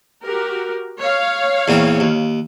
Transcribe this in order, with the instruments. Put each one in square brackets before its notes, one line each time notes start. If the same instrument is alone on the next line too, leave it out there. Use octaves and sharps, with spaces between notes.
[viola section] F#4 G4 A#4
C#5 F5
[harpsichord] E2 A#2 C4
D#2